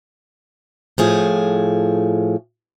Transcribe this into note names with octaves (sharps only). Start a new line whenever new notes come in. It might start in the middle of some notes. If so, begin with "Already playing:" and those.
A2 F3 G#4